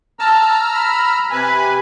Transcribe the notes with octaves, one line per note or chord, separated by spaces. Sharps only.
A5 A#5 E6 F6
B5
C3 B4 G#5